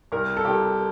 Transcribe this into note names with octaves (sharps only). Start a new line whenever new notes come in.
C2 A#4
A4
C2 G4